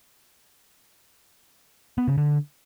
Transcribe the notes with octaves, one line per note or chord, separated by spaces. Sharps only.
B3
C#3
D3